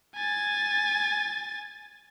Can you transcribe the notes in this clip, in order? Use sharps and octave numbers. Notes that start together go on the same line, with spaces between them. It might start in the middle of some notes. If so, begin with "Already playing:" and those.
G#5 A6